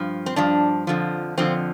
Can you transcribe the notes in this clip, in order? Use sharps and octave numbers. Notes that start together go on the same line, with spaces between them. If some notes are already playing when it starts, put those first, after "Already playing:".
Already playing: G2 F3
C4
G2 F3 D4
F2 D3 F3
F2 D3 F3 C4